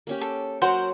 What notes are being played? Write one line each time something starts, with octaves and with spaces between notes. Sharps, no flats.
A#3 C#4 G4
A4
F#3 F#4 A#4 C5 F#5